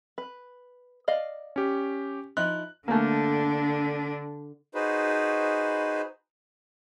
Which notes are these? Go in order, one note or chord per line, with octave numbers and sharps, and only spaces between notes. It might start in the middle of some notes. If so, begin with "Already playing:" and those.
B4
D5 D#5 F5
C#4 G4
F3 D#4 E4 F#6
D3 A3 A#3 D4
D#4 F#4 G#4 B4 C5